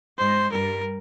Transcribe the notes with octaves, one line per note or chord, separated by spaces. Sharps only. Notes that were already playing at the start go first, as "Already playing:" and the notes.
G#2 G#3 C5
G2 G3 A#4